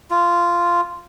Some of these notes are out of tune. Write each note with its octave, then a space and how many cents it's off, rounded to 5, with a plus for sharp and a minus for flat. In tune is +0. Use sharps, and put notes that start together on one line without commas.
F4 -10